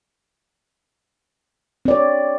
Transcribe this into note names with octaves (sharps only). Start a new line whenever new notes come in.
C4 C#5 D5